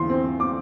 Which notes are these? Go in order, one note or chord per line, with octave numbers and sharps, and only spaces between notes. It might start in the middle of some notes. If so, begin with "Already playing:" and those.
Already playing: E2 D3 C6
C4
D6